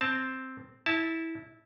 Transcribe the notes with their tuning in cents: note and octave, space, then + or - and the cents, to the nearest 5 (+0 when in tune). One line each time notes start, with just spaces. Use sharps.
C4 +0 A5 +0
E4 -15 A5 +0